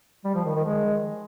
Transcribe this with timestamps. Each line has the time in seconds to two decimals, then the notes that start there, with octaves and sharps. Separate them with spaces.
0.25 G3
0.35 F3
0.45 D#3
0.55 D#3
0.65 G#3